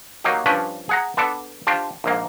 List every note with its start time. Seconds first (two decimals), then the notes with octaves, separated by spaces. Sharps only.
0.24 F#3 A#3 D#4 G4
0.46 G2 F3 C#4 D4 B4
0.89 G#4 F#5 A#5
1.17 B3 D4 A4 D5
1.67 D4 F4 G4 C5
2.04 A#1 G#2 A#3